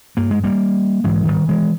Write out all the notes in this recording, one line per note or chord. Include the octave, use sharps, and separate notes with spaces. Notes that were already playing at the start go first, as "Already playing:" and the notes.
G2 A#3
G#3
G3 A#3
G#2 E3 G#3
E3
D#3 G3
E3 G#3